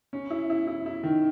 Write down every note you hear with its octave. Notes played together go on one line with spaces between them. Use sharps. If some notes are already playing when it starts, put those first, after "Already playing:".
C#4
E4
E4
E4
E4
D#3